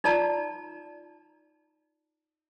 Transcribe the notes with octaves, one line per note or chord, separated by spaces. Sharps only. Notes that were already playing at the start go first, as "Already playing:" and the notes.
D#4 F4 D5 A5 A#5